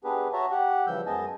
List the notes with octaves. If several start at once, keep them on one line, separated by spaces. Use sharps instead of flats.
B3 D4 G4 G#4 B4
F#4 C#5 E5 A5 A#5
G4 F#5
C#3 E3 F3 G3 E6 G6
F#2 G#3 B3 D#5 G#5 A5